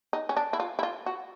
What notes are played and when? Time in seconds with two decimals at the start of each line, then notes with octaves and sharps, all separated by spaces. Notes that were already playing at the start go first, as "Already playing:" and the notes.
0.13 D#4
0.29 C#4
0.37 D4
0.53 E4
0.60 F4
0.79 E4
0.83 F4
1.06 F#4